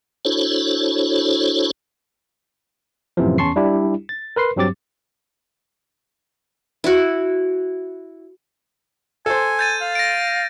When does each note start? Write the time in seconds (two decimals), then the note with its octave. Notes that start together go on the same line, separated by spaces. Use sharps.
0.25 D4 E4 F#4 A4 C5 C#5
3.17 F#2 A2 C3 E3 F3
3.38 E2 C#4 A5 C6 C#6 C7
3.56 G3 D4 E4 G4
4.09 A6
4.36 A#4 B4 C6 C7
4.56 G2 F#3 C4 G4 D6 A6
6.84 E4 F#4
9.26 A4 C5 G#5
9.59 G6 A6 D#7
9.81 F5
9.95 A#6 D7